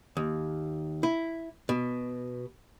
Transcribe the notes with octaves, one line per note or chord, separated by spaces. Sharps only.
D#2
E4
B2